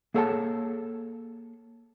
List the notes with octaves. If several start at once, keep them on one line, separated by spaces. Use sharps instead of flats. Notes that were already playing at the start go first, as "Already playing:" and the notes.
A#3 G#4 A4 C#5 F#5 A5